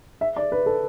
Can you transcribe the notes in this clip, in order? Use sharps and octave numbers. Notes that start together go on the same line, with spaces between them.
E5
D5
B4
A4